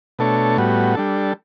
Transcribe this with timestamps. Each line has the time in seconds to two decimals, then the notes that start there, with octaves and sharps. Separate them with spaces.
0.19 B2 A3 D4 A4 C#5
0.57 A2 G3 B3 F#4
0.95 G3 D4 A4